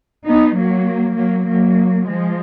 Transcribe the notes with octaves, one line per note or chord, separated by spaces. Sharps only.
B3 D#4
F#3 A#3
F#3 A#3
F#3 A#3
F3 G#3